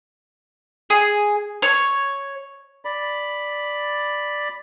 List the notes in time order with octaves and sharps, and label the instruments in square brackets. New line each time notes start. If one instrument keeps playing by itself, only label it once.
[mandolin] G#4
C#5
[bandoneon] D5 B5